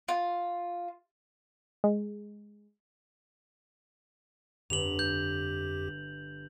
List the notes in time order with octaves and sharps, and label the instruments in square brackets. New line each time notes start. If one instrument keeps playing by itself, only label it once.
[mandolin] F4
[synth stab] G#3
[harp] G1 [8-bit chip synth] F2 G4 [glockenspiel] F7 F#7
[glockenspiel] G6